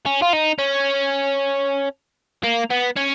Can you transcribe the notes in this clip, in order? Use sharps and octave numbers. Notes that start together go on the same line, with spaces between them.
C#4
F4
D#4
C#4
A#3
B3
C#4